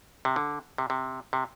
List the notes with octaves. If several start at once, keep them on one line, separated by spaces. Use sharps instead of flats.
C3
D3
C3
C3
C3